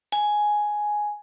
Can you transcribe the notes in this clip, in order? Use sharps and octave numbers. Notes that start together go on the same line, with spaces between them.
G#5